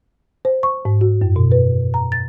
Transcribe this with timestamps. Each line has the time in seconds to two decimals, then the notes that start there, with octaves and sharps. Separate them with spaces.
0.45 C5
0.63 C#6
0.85 G#2
1.01 F#4
1.21 F#2
1.36 B2
1.52 B4
1.94 A#5
2.12 A6